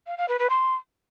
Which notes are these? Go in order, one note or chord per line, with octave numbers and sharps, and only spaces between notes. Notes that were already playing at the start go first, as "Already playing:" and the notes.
F5
F5
B4
B4
C6